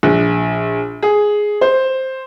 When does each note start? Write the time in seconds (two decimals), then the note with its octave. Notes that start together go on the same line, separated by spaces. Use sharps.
0.03 A#1
1.03 G#4
1.61 C5